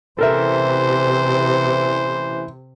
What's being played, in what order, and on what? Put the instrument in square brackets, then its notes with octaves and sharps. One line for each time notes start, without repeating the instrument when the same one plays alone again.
[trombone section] A1 E3 [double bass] C3 [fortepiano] A4 A#4 E5 [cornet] C5